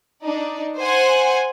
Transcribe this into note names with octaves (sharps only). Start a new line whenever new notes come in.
D4 D#4 D5
C5 F#5 G#5 C6